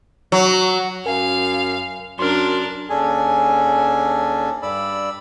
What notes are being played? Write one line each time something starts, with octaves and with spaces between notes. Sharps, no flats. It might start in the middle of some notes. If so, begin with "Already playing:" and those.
F#3
F#2 A#4 F5 G#5
F#2 D4 A#4 C6 F6
D#2 C#4 D4 G#4 A4 G#5
G2 D5 B5 E6